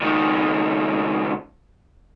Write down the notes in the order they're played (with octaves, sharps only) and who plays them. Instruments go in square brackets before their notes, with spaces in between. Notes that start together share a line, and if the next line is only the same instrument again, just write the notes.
[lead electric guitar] C#2 D#3